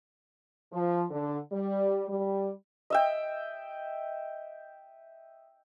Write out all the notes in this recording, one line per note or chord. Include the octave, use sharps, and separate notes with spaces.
F3
D3
G3
G3
D#5 E5 G5